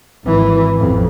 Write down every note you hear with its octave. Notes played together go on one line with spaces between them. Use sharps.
G#1 E3
A1 F2